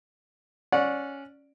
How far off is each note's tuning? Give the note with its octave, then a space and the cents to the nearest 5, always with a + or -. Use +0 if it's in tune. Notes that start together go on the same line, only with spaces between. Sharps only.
C#4 +0 D5 +0 F#5 -25